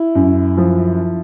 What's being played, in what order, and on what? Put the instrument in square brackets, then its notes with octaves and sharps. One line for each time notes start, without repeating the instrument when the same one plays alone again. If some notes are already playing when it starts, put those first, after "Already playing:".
Already playing: [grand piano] E4
F#2
F3